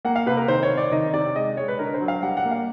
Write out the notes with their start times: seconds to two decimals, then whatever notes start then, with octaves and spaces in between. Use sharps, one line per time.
0.05 A#3 F#5
0.16 F5
0.26 C3 B4
0.37 A#4
0.48 D#3 C5
0.63 C#5
0.71 C4
0.78 D5
0.92 D#3 D#5
1.14 C3 D5
1.36 G#3 D#5
1.57 G#3 C#5
1.68 B4
1.79 D3 A#4
1.94 C5
2.00 F#3
2.08 F5
2.22 G3 F#5
2.37 F#5
2.45 A#3
2.51 F5